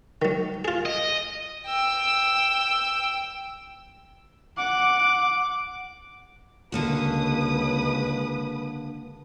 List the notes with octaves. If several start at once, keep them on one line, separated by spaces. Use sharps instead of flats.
D#3 F#3
F4 G#4
D#5
G5 E6
F#5 D6
C#2 D3 A#3 F#4 B4 D#6